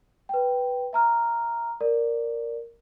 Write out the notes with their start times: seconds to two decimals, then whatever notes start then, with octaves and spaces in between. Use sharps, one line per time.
0.29 B4 G5
0.93 E5 A#5 F6
1.81 A#4 D5